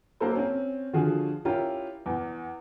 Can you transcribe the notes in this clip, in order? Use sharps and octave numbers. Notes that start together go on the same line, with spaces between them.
F#3 A#3 E4 A4 C5
C4 C#4
D3 F3 F4 F#4 G#4
C#4 E4 F4 G4 A#4
E2